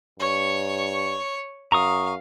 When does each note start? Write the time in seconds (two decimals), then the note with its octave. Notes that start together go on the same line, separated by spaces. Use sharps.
0.20 G2 C#5 C#6
1.72 F#2 F5 A#5 C#6 D#6